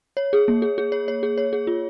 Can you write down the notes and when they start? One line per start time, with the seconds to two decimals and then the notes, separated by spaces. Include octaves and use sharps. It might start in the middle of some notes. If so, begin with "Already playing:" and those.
0.17 C#5
0.33 G#4
0.48 A#3
0.62 G#4
0.78 G#4
0.92 C#5
1.08 C#5
1.23 G#4
1.38 C#5
1.53 G#4
1.67 F4